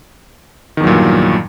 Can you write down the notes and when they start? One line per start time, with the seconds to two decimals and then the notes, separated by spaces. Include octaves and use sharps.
0.77 D#3
0.80 E2
0.84 F#3
0.87 A#2
0.90 G2